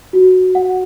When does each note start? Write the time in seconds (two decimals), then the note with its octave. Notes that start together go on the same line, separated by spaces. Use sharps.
0.13 F#4
0.55 F#5